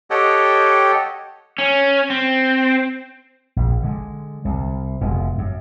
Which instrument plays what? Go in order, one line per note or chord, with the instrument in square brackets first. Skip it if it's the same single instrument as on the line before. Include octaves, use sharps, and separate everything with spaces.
[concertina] G4 A4 C#5 D#5 F#5 G5
[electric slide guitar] C#4
C4
[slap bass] A#1
D3 G#3
C2
F1 B2 G#3
F#2